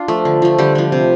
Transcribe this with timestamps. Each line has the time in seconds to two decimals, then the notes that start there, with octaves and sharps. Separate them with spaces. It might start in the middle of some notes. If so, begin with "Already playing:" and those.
Already playing: D4 F4
0.08 F3 A3
0.25 D3
0.42 F3 A3
0.58 D3 G3 G4
0.75 F3 A3
0.92 C3